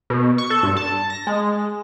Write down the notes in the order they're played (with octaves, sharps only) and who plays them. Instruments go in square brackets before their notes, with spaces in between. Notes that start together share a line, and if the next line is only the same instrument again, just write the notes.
[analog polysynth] B2
C#6
A4
G2
A5
A#6
G#3